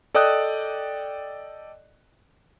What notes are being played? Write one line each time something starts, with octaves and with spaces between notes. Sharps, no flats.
A4 D5 D#5 G5 D#6 F#6